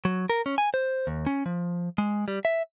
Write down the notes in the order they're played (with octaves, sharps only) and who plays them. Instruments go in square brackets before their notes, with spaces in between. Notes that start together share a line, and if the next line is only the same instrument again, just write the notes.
[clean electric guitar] F#3
A#4
C#4
G#5
C5
D#2
C#4
F3
G#3
G3
E5